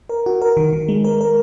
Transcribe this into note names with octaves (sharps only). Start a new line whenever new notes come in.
A#4
F#4
A#4
D#3
D#3
G#3
A#4
A#4